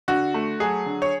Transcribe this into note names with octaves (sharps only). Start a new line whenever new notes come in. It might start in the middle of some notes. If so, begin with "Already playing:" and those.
D3 F#4
A3
F#3 G#4
D3
C#5